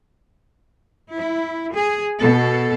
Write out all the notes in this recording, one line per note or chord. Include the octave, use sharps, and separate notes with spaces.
E4
G#4
B2 A4